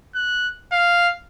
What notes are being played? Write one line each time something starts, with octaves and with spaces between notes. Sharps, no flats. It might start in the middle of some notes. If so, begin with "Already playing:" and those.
F#6
F5